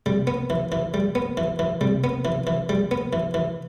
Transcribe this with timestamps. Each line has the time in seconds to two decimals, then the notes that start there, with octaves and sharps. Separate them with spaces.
0.06 C3 G3
0.27 B3
0.50 E3
0.72 E3
0.94 G3
1.15 B3
1.37 E3
1.59 E3
1.81 C3 G3
2.04 B3
2.25 E3
2.47 E3
2.69 G3
2.91 B3
3.13 E3
3.34 E3